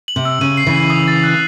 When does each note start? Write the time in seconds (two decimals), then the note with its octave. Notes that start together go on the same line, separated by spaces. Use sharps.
0.08 F#7
0.16 C3
0.25 E6
0.41 C#3 D#7
0.57 C7
0.66 C#3 E3
0.74 F#7
0.90 D#6
1.08 A6
1.24 F#6